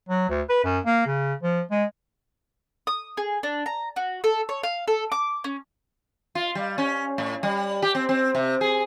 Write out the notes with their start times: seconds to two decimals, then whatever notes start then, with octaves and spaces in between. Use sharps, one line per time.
0.09 F#3
0.29 D2
0.49 B4
0.64 F#2
0.85 A#3
1.06 C#3
1.43 F3
1.71 G#3
2.87 D#6
3.17 G#4
3.43 D4
3.66 A#5
3.96 F#4
4.24 A4
4.49 C#5
4.63 F5
4.88 A4
5.12 D6
5.44 C#4
6.35 F4
6.55 G3
6.78 C#4
7.18 A2
7.43 G3
7.82 G4
7.95 C4
8.09 C4
8.35 C3
8.61 G#4